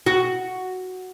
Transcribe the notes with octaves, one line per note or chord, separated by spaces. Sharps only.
F#4